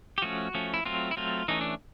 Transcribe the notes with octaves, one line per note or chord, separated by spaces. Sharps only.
G4
F3 A3 C#4 F#4
F3 A3 C#4
E4
F#3 A3 C4 F4
E4
F#3 A3 C4 F4
E3 A3 C#4 D#4
D4